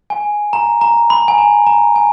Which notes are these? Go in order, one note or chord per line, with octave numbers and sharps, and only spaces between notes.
G#5
A#5
A#5
B5
G#5
A#5
A#5
G#5